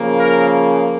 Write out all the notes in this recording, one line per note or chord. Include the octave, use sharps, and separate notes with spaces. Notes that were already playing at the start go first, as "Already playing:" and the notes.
Already playing: C#3 F3 A#3
A#4